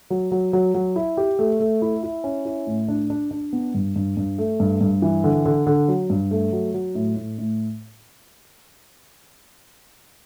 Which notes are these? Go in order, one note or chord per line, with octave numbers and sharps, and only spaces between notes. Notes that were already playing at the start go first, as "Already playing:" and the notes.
F#3
F#3
F#3
F#3
E4
G4
A3
A3
E4
E4
C#4
E4
A2
D4
D4
D4
B3
G2
G2
G2
A3
G2
G2
E3
D3
D3
D3
F#3
G2
A3
F#3
F#3
A2
A2
A2